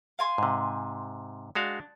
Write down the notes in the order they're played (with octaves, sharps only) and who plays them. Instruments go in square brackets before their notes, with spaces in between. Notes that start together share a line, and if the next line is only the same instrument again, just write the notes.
[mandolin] F5 G#5 C6
[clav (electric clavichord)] G#2 C3
[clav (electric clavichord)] G#3 F#4 F5 [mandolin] D4